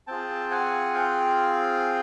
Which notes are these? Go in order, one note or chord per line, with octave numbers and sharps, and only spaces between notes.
C4 F4 G#4 G5 A5
F#5 G#5
F5 G5